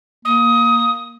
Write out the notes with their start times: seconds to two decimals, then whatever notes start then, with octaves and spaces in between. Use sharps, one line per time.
0.25 A#3 D#6